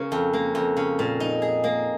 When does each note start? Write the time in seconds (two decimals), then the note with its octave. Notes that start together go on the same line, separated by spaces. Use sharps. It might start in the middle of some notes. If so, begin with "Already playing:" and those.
Already playing: C#3 A#3
0.12 F2
0.33 A#3
0.55 F2
0.77 C#3
0.99 A#2
1.20 D#4
1.42 G#4
1.64 A#3